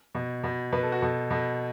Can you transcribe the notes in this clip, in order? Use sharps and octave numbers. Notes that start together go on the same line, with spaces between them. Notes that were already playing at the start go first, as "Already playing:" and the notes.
B2
B2
B2 B4
A4
F#4
B2 A4
B2 A4